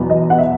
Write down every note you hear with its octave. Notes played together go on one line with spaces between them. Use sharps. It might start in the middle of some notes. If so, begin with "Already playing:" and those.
Already playing: E2 B2 F#3 B3
D#5
F#5
E5